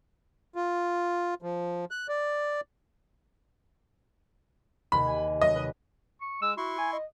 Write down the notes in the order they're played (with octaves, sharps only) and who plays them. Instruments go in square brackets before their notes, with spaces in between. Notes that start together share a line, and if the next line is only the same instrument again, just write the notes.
[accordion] F4
F3
F#6
D5
[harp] D#2 C3 [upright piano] B5
[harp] G#5
[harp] F#3 [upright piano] D#5
[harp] B4
[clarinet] C#6
[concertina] G#3 [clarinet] E6
[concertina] E4 C6 C#6 [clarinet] F#4
[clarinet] G#5
D#5